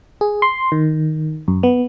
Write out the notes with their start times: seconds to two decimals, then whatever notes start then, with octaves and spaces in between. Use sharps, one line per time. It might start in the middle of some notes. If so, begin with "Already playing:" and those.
0.21 G#4
0.42 C6
0.72 D#3
1.48 F#2
1.63 B3